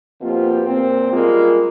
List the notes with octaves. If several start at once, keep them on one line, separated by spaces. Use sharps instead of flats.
B2 F3 A#3 C4 F4 G4
A#2 C4
F#2 G3 G#3 A#3 F4